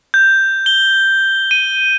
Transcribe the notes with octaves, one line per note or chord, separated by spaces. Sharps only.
G6
G7
D#7